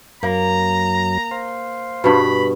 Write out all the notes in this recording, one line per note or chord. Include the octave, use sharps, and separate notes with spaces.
F#2 F#3 A#3 A#5
C5 F5
G2 B2 B5